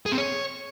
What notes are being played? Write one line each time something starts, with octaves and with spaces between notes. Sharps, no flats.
G#4
C4
C#5